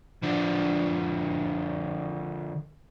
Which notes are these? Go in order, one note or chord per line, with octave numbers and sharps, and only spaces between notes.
D3 F3